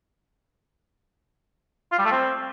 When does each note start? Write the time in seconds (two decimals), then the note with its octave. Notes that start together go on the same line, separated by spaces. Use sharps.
1.92 F4
1.98 G3
2.05 A3
2.12 C4